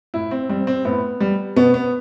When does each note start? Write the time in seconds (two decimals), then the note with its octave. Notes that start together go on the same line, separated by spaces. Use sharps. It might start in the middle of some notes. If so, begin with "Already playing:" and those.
0.14 A2 E4
0.31 C4
0.49 G3 C4
0.67 C4
0.85 A2 B3
1.20 G3
1.56 B2 B3
1.74 B3